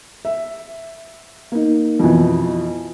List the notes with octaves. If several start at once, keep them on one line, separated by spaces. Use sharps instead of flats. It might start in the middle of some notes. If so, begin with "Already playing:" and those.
E5
A#3 D#4
F2 B2 E3